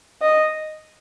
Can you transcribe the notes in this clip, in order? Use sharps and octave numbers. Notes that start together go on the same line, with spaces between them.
D#5